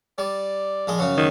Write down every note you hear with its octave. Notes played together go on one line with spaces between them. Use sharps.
G3 D5
A#1 G#3 D#6
F#2 C#3 F#3
D#3